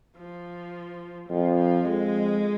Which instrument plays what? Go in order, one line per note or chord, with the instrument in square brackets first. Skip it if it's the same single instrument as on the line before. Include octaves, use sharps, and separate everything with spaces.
[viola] F3
[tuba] F2 [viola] F3
[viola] F3
[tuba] F2 [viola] G#3